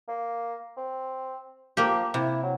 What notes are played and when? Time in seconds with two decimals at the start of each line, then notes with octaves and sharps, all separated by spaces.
0.08 A#3
0.77 C4
1.77 F3 A#3 G4
2.14 C3 E4
2.43 F#3